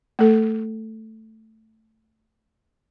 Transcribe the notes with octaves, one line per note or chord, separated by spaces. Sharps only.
A3 A4